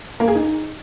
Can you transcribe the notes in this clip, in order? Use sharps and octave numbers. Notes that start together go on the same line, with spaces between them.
A#3
G#4
D#4